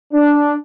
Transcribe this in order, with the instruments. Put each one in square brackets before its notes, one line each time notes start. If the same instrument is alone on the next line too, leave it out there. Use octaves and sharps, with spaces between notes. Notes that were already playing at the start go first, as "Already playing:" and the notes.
[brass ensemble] D4